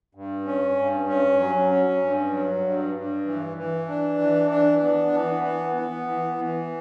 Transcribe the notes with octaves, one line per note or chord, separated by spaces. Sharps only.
G2
C#4
G2
C#4
F#3
C#4
G2
F#3
G2
G2
E3
E3
D4
E3
D4
B3
E3
B3
B3
E3
E3